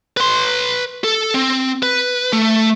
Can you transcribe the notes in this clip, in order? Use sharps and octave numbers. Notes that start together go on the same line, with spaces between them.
B4 C6
A4
C4
B4
A3